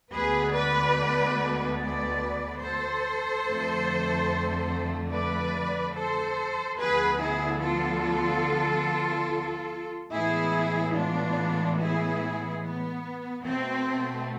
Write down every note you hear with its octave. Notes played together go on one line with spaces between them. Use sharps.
D2 D3 G#3 B3 G#4 B4
B4 D5
B4 D5
A4 C5
F2 D3 A3
B4 D5
A4 C5
D2 D3 F3 B3 G#4 B4
E4 G#4
F4 A4
A2 E3 G#3 B3 E4 G#4
D4 F4
E4 G#4
B3
B2 A3 C4